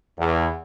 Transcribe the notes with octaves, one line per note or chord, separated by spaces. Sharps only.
E2